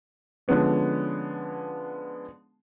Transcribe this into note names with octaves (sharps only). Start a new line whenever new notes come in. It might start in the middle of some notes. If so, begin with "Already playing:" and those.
D3 F3 G#3 B3 C#4